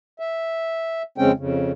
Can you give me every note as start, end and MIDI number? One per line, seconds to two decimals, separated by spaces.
0.20 1.02 76
1.18 1.32 41
1.18 1.32 49
1.18 1.32 56
1.18 1.32 60
1.18 1.32 61
1.18 1.32 79
1.37 1.72 41
1.37 1.72 49